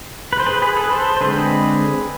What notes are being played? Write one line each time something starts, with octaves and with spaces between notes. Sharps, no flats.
B4
C5
G#4 B4
G#4 B4
A4
B4
A4 C5
C5
D3 G#3 C4 G#4 B4